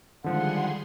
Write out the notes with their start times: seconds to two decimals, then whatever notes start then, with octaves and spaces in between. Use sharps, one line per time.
0.24 D3 D#3 F3 G3 G#3 G#4 F#5 C6